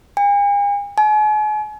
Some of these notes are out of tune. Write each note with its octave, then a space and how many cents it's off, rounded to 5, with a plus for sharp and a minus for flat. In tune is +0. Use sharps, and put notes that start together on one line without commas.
G#5 -45
G#5 +40